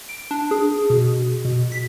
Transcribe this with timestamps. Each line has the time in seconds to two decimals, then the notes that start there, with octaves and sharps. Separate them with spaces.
0.09 D7
0.31 D4
0.51 G#4
0.90 B2
1.45 B2
1.72 B6